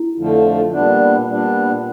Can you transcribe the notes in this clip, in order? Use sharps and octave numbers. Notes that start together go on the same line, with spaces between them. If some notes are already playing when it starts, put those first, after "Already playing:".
Already playing: E4
F2 D3 F3 A3
A#2 G3 B3 D4
A#2 G3 B3 D4